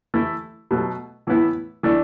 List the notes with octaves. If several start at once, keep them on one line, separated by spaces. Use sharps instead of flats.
E3 A3 E4
B2 F#3 A3
A2 E3 B3 E4
E3 A3 D4